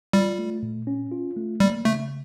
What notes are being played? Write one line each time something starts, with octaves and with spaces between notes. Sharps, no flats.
G3 F4
A3
A#2
C#4
F4
A3
G3 A#3
C#3 A3